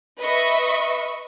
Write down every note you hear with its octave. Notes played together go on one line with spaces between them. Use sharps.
B4 D#5 E5 C#6